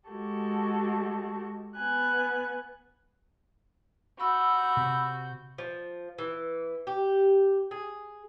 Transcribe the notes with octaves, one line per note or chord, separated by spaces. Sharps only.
G#3 F#4 G4 A4 C#6
B3 G#5 F#6
F#4 B5 E6 G6
C3
F3
E3
G4
G#4